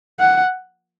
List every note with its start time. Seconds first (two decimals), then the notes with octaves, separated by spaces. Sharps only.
0.20 F#5